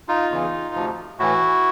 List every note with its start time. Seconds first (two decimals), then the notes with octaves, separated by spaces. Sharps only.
0.08 D#4 F4
0.30 E2 C#3 E3
0.75 D2 C3 F3
1.19 A2 E3 E4 F#4